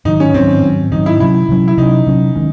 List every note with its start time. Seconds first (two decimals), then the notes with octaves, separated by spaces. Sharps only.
0.05 G#2 D#3 F#3 D#4
0.20 C#4
0.34 G#2 D#3 F#3 C4
0.62 G#2 D#3 F#3
0.91 G#2 D#3 F#3 D#4
1.06 E4
1.20 C3 F#3 C#4 E4
1.49 C3 F#3 C#4
1.68 E4
1.78 C3 F#3 C#4 D#4
2.07 C3 F#3 C#4
2.35 D#3 G#3 C#4